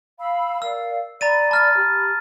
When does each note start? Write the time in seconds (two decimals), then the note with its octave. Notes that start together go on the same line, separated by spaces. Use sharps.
0.20 F5 B5 E6
0.62 A#4 D5 F5 E6
1.21 D5 A#5 B5 A6 D#7
1.51 A5 F6 A6
1.76 G4 B5